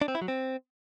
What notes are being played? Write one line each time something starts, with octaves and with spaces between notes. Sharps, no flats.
D4
C4
E4
F#3
C4